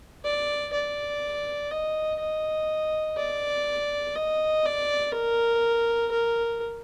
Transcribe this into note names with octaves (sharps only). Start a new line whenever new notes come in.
D5
D5
D#5
D#5
D5
D#5
D5
A#4
A#4